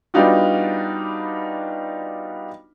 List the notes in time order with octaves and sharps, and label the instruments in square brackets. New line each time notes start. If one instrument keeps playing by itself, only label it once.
[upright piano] G3 B3 D4 D#4 F4 F#4